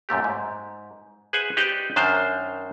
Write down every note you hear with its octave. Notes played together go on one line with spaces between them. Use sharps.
F#2 A#2 A3 G4
G#2
G#4 B4 C5 E5 F#5 G#5
D#4 G4 B4 C5 D5 D#5
F#2 D#3 D4 C5 E5 F5